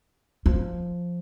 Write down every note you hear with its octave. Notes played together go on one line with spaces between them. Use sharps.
F3